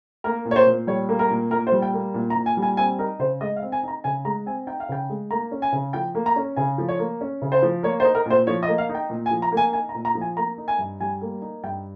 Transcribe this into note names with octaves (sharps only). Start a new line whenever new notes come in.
A#3 A#4
A#2
C#5
C5
A#2
G3 C#5
A#3
A#4
A#2
A#2 A#4
C5
G3
G5
A#3
A#2
A#5
A#2
G#5
G3
G#5
C4 G#5
D#4 A#4
C#3 C5
G#3 D#5
F5
C4
G#5
D#4 A#5
C#3 G#5
G#3 A#5
C4 G#5
D#4 G5
F5
C#3 G5
G#3
A#3 A#5
C#4
G#5
C#3
F3 G5
A#3
A#5
C#4
C#3 G#5
F3
C#5
A#3
C#4
C#3
C5
F3
A#3 C#5
C5
D#4
A#4
A#2 C5
F3 C#5
D#5
A#3
F5
D#4
G5
A#2
G#5
F3
A#5
A#3
G#5
D#4 G#5
A#5
A#2
A#5
F3
G#5
A#3 A#5
D#4
G#5
G2
G3 G#5
A#3
D#4
G2 G5